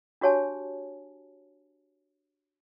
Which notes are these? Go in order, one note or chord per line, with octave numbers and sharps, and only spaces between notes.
D4 F#4 G4 C#5 G#5 A5